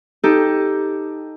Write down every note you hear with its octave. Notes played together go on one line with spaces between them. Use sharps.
D#4 G4 A4